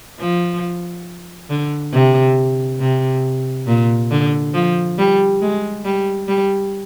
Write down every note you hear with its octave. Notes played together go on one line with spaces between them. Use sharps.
F3
D3
C3
C3
A#2
D3
F3
G3
G#3
G3
G3